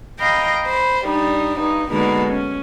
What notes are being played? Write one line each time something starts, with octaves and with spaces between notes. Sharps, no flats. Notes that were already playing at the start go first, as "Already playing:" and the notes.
D#5 F5 G5 A#5 B5
C5 B5
G3 D4 D#4
G2 D#4
B2 D3 G#3 A#3 D#4 A4
C#4